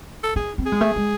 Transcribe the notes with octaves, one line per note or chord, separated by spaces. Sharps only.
A4
D#4 G#4
C4
G#4
G#3
A3
G#3